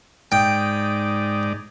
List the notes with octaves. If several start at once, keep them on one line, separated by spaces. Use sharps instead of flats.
G#2 D#4 D5 G5